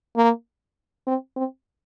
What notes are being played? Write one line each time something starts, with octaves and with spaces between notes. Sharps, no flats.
A#3
C4
C4